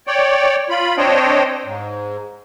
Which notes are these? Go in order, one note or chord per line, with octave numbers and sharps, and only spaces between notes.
C#5 D5 G5
F4 B5
C4 D4 C5 C#5 D#5 G5
G#2